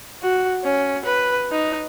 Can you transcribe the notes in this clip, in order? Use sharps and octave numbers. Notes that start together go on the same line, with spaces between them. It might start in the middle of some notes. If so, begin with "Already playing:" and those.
F#4
C#4
B4
D#4